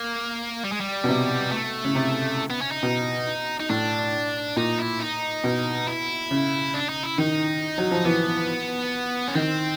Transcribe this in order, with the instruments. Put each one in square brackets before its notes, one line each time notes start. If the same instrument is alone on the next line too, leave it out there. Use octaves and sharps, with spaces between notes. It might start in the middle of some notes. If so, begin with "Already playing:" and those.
Already playing: [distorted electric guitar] A#3
G3
G#3
G3
[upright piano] B2
C3
[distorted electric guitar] A3
[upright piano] C#3
C3
[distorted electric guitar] B3
C#4
D#4
[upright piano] B2
[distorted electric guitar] D#4
[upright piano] A2 [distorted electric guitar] D4
[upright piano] A#2 [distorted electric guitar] D#4
[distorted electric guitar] E4
D#4
[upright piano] B2
[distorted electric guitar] E4
[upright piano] C#3
[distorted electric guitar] D4
D#4
E4
[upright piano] D#3 [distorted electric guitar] D#4
[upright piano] F#3
F3
[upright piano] E3 [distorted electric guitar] B3
[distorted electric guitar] C#4
[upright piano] D#3 [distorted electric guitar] C4